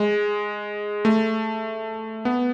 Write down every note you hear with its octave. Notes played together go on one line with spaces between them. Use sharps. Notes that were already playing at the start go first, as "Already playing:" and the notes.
Already playing: G#3
A3
B3